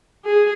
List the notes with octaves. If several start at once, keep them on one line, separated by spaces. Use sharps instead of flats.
G#4